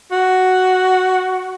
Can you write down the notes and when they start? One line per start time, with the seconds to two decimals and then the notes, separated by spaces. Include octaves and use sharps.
0.11 F#4